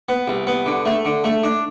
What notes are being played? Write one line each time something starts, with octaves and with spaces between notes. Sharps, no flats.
B3
C2
B3
D3
A3
D3
A3
D4